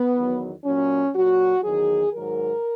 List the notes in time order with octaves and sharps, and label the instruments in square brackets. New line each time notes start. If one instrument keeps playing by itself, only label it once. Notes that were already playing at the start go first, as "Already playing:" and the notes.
Already playing: [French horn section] B3
E2 D#3 F#3
A#2 F#3 C#4
A#2 F#3 F#4
E2 D#3 F#3 G#4
G#2 D#3 F#3 A#4